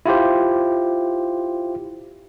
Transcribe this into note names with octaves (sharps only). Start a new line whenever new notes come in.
E4 F4 G4 C5